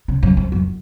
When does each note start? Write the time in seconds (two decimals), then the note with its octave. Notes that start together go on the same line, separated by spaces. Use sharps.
0.08 C#3
0.23 F#2
0.37 F2
0.52 F#2